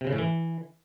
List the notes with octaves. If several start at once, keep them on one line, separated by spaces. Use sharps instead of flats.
C3
C#3
A2
E3